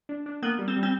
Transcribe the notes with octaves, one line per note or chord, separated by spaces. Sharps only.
D4
D4
A#3 B3
G3
C4
G3
C4